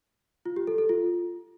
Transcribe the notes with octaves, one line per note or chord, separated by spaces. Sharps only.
F4
G4
A4
A4
F4